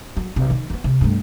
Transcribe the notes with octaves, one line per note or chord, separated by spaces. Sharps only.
F#3
B1 C3
D#3 F3
G#3 B3
C3
G2 A3